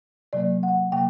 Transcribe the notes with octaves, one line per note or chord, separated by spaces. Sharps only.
C3 F#3 A#3 D5
F#5
C3 F#3 A#3 G5